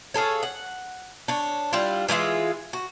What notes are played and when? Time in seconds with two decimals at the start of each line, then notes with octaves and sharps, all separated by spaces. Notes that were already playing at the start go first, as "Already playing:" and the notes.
0.14 F4 G#4 A4 C#5
0.43 F#5
1.28 D4 C#5
1.73 G3 D4 E4 F4
2.08 E3 G#3 F4 E5
2.73 F#4